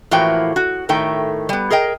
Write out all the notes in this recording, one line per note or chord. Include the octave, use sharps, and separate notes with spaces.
A2 E3 F3 A#3 F#4 G5
F#4
A2 D#3 A3 G5
G3 B3
G#4 A#4 D#5 G5